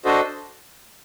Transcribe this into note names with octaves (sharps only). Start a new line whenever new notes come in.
D4 F#4 A4 C5 D#5